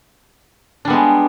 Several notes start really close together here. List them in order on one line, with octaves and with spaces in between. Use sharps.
D4 G3 B3 G#3